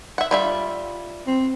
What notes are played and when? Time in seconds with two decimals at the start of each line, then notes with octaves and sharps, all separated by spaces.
0.18 E5 F#5
0.31 G3 F4 E5
1.27 C4